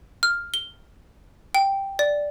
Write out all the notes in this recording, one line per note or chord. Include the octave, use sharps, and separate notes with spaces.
F6
G7
G5
D5